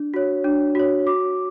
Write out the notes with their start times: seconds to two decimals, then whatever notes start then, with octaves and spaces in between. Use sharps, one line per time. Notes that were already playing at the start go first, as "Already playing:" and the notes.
Already playing: D4
0.14 F#4 C#5
0.44 D4
0.75 F#4 C#5
1.07 F#4 D6